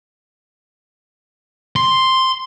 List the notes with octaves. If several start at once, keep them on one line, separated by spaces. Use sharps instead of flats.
C6